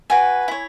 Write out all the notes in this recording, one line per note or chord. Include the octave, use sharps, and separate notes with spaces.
F#4 B4 G#5
E4 C#5